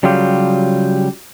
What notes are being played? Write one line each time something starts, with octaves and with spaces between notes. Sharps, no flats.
C#3 F#3 G3 F4 G4